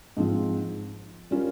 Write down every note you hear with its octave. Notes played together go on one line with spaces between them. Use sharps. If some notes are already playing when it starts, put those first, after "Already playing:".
G#2 F3 C4
G3 C#4 F4 A#4